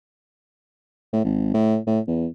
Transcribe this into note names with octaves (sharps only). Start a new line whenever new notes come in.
A2
G#1
A2
A2
E2